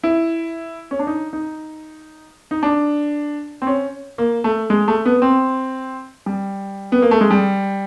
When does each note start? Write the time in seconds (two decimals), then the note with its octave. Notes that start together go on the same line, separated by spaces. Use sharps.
0.03 E4
0.91 C#4
0.99 D4
1.07 D#4
1.33 D#4
2.51 D#4
2.63 D4
3.62 C4
3.67 C#4
4.18 A#3
4.44 A3
4.70 G#3
4.88 A3
5.05 B3
5.22 C4
6.26 G3
6.92 B3
7.02 A#3
7.11 A3
7.21 G#3
7.30 G3